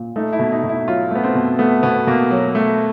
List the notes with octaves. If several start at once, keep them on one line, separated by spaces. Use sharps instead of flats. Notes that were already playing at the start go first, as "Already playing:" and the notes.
Already playing: A#2
A3 D#4
E4
B2
D#4
B2
E4
F#3 F4
A3 B3
C4
B2
A3 B3
B2 B3
B2 A#3
F#3
A3